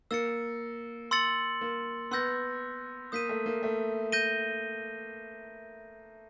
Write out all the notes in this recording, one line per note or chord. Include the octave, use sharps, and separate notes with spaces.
A#3 E6 A6 C#7
C6 E6 A6 C#7 F#7
A#3
B3 C6 E6 G6 A#6
A#3 D#6 G6 B6 D#7
A3
A#3
A3
G6 A#6 D#7 G7